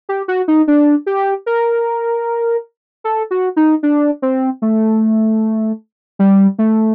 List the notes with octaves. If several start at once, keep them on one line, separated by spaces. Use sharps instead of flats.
G4
F#4
D#4
D4
G4
A#4
A4
F#4
D#4
D4
C4
A3
G3
A3